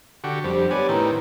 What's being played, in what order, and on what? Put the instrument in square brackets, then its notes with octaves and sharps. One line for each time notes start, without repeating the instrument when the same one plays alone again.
[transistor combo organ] D3 F#4 G4
[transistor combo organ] F2 G3 [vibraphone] D4 G4 C5
[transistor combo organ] B3 D5 G#5 [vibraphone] C#5
[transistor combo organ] A2 D#3 C4 [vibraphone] E4 B4 A#5